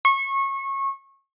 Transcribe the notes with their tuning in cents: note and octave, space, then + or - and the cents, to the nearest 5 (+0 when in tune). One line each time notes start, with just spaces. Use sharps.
C#6 -25